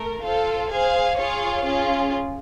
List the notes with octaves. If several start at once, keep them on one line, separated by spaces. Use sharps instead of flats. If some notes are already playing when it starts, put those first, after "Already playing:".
Already playing: A3 A#4
F4 A4 C5 F5
G#4 C5 F5 G#5
F4 G#4 C#5 F5
C#4 F4 G#4